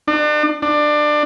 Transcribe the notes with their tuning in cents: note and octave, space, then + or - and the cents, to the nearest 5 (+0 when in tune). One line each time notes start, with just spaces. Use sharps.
D4 +35
D4 +20